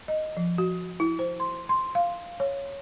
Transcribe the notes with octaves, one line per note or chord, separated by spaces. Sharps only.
D#5
F3
F#4
E4
C5
C6
C6
F5
C#5